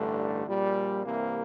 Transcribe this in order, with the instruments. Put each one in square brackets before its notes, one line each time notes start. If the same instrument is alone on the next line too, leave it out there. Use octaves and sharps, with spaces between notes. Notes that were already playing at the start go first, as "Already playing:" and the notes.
Already playing: [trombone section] A1 G2 D3 A3
A#1 A#2 G3
C2 C3 E3 A#3